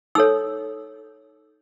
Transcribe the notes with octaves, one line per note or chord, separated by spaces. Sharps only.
D#4 A4 C#5 E6